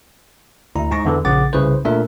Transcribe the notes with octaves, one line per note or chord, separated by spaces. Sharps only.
D2 E4 A#5
G#2 D#4 C#6 A#6
E2 D3 E3
A#1 C#3 F#5 D6 A6
C2 C#3 E4 B4 C5
A#2 A3 D4 A#4 E5